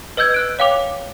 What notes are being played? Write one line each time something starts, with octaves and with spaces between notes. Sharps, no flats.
B4 D#5 E6 G6 G#6
E6 F#6 D7
C#5 F5 G5 D6 F7